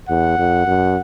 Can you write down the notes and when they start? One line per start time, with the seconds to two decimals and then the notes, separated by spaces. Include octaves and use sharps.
0.09 E2 F#5
0.39 F2
0.67 F#2